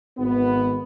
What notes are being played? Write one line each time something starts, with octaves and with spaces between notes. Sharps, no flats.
G#1 B3